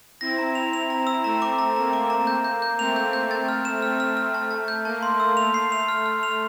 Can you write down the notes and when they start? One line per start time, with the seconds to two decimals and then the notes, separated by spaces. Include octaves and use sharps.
0.21 C4 E4 A#6
0.38 A#5
0.55 F7
0.73 F7
0.90 A#5
1.07 E6
1.24 A3 C4 A#5
1.42 D6
1.59 A#5
1.76 A#3 A#5
1.93 D6
2.10 A#5
2.27 G6
2.44 G6
2.62 G6
2.79 A3 C4 F7
2.96 G6
3.13 G6
3.31 A6
3.49 F6
3.65 E7
3.82 A3 F6
4.00 F6
4.17 F6
4.34 A5
4.51 A5
4.68 G6
4.85 A#3 A5
5.03 C6
5.20 E6
5.37 A3 F7
5.54 C7
5.72 F7
5.88 F6
6.06 F6
6.23 F7